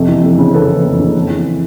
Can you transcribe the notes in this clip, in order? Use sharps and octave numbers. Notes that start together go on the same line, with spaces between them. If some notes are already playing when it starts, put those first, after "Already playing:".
Already playing: F2 C3
E3
F2
C#3
F2 A4 B4
E3
F2
C#3
F2
E3